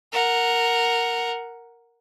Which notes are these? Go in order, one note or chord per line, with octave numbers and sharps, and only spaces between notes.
A#4 F#5